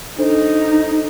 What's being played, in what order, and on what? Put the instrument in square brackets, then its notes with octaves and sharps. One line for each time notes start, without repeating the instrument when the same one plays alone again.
[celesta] D4 A4 C5 [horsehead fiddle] D#4